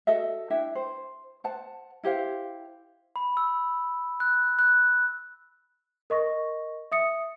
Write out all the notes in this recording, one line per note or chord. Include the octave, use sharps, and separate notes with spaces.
F#4 A4 D#5 E5
D4 E4 E5 G5
C5
C5 F#5 A5
E4 G4 C5 F5
B5
E6
F#6
F#6
A#4 D#5 C#6 A#6
E5 D#6 C#7